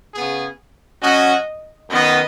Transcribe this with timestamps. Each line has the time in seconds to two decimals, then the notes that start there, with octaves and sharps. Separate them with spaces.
0.15 C#3 B3 G#4
1.02 F#3 C#4 F#4 D#5
1.90 F#2 D#3 B3 D#5